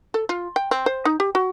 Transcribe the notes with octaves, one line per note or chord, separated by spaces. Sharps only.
A4
F4
G5
C4
C5
D#4
G4
F#4